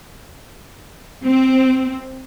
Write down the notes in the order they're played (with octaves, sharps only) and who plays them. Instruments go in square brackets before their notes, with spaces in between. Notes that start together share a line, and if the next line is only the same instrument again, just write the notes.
[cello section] C4